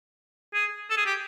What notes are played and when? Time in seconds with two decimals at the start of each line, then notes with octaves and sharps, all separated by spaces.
0.53 G#4
0.90 A4
0.97 G#4
1.06 G4